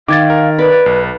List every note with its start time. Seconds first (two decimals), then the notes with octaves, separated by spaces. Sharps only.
0.08 D#3 F5 D6 G#6 A6
0.30 A#4
0.58 B4 D5 B5
0.86 B1